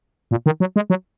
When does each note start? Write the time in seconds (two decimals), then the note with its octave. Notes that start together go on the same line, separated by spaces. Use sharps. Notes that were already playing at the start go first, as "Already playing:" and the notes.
0.31 A#2
0.46 D#3
0.60 F#3
0.76 G#3
0.90 F#3